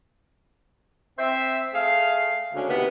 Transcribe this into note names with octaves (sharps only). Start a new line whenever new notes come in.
C4 C5 E5
A3 G#4 F5
D2 C#3 G#3 C#4 D4
D#2 C3 B3